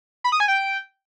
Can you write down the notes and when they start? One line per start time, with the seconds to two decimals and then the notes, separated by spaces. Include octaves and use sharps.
0.24 B5
0.32 D#6
0.40 G#5
0.48 G5